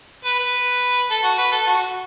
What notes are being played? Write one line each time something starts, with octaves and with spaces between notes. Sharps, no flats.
B4
B4
A4
F#4
B4
A4
F#4